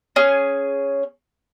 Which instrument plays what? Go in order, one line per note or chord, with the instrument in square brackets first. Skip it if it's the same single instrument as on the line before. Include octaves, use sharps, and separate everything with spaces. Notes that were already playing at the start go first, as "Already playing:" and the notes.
[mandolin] C#4 G#4